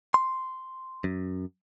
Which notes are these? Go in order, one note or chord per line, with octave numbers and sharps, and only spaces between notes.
C6
F#2